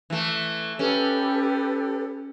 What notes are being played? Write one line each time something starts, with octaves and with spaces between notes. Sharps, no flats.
E3 A3
C#4 G4 A4 B4